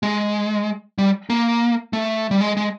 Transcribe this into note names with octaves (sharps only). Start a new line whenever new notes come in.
G#3
G3
A#3
A3
G3
G#3
G#3